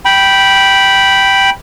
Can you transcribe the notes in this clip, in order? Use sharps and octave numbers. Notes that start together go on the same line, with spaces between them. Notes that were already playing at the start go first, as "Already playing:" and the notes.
G5 B5